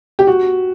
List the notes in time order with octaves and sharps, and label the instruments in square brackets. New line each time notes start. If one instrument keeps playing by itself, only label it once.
[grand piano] G4
F#4